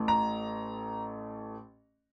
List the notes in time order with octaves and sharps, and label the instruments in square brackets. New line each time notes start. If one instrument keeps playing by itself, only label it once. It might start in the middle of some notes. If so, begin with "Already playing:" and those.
Already playing: [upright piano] A1 A2 A3
A#5